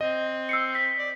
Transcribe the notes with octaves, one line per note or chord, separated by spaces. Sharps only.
C4 D#5
E6 C7 C#7
B6
D5